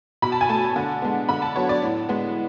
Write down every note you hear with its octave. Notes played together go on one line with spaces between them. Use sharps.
B2 B5
A5
G#5
A3 A5
D3
G#3 B3
D3 B5
A5
F#3 B3 C#5
D5
A2
G#3 B3